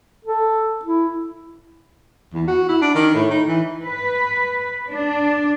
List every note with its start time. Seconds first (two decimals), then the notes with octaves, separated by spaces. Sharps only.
0.24 A4
0.85 E4
2.33 E2
2.47 F#4
2.68 E4
2.81 D4
2.95 D#3
3.14 A2
3.30 D#4
3.48 E3
3.81 B4
4.88 D4